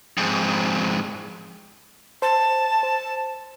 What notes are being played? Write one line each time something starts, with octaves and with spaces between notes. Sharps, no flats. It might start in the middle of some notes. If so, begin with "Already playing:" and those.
F2 G#2
C5 A5
C5